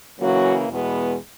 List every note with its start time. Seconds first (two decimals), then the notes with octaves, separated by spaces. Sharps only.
0.19 C#3 E3 F#3 A#3 C#4 F#4
0.68 E2 B2 G#3 B3